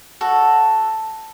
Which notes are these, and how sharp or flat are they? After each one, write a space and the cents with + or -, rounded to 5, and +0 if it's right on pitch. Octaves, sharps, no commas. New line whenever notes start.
F#4 +0 A4 +0